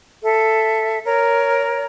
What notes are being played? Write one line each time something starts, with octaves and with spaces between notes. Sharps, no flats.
A4 E5
A#4 C#5